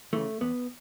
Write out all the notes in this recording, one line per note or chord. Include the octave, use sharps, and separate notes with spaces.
C#3 E3 A3
E2 B3